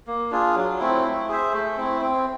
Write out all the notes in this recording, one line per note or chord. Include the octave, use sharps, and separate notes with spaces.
A#3
D4 F4 G#4
F#3
A3 C4 E4
E4
G#4 C5 E5
A3
C4 E4
C4